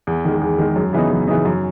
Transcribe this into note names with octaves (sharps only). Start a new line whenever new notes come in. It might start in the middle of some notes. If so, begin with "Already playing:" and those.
E2
D#3 G#3
E2
D#3 G#3
F#2
C#3 E3 B3 D#4
F#2
C#3 E3 B3 D#4
F#2